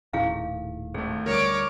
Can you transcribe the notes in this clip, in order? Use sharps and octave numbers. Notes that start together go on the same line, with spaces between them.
D#1 A2 D#3 E4 G#4 F5
G#1 A3 G#4
D2 G3 A#4 C#5 D6